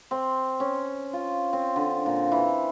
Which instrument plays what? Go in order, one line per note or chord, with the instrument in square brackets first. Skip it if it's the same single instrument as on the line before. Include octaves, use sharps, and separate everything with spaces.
[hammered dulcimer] C4
C#4
F4
C4
D3
A#2
E3